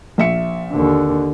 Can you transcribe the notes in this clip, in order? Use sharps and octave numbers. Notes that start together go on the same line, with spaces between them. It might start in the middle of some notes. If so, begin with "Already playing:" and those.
A#1 E5 C#7
D#2 D3